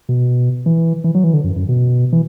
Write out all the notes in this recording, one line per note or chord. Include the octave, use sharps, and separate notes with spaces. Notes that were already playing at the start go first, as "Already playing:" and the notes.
B2
E3
E3
F#3
E3
D3
F#2
F#2
B2
E3